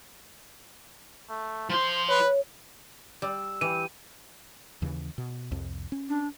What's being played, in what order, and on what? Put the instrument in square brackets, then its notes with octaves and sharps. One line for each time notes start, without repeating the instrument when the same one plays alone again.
[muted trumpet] A3
[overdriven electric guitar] F3 C6 [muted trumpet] C5
[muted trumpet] B4 [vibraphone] C#5
[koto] G3 [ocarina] E6
[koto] E3 [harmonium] G4 [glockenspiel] D#7
[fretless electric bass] D#2 C#3 E3
B2
C2 F2
C#4
[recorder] D4